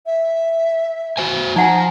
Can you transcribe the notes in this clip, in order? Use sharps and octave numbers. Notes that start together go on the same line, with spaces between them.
E5
F#4 C5 G#5
F3 D#4 F#5 G#5 A#5